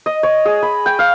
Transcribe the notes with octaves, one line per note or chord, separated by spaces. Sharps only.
D#5
C#5
G#4
B5
G5
F5